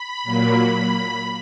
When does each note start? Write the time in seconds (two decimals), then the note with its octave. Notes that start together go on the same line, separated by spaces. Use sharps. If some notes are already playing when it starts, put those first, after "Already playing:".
Already playing: B5
0.23 A#2 F#3 A#3